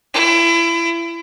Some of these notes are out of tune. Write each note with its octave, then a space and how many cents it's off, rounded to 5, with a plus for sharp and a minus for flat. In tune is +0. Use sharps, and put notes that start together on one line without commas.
E4 +30